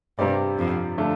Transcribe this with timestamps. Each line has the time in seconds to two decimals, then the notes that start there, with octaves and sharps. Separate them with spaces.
0.19 G2 C3 G3 C4 G4 D5
0.58 F2
0.97 D3 F3 A3 D4 F4